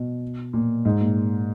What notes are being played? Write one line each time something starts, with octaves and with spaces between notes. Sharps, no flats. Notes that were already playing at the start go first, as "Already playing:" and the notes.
Already playing: B2
A#2
G#2
A#2